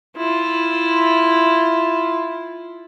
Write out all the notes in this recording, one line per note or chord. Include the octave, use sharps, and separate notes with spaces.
E4 F4